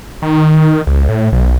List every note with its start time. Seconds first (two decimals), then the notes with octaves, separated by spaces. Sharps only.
0.22 D#3
0.87 C#2
1.09 A2
1.32 B1